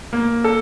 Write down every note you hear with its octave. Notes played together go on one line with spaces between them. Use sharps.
A#3
A4